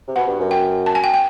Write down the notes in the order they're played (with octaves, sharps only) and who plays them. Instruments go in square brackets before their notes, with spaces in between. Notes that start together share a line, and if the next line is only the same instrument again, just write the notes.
[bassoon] C3
[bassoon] B2 [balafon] F#5
[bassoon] G2
F#2
[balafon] G5
A5
G#5
G5
G5